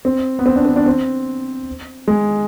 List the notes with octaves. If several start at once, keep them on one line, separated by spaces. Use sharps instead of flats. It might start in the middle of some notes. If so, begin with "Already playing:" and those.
C4
B3
C4
D4
C4
D4
C4
G#3